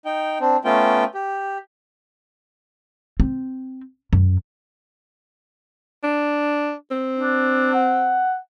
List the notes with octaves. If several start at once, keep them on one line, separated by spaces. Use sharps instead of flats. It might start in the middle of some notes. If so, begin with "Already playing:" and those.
D#4 G5
C4 D4
A3 B3 C#4 F4 G5
G4
C4
F#2
D4
C4
D4
F#5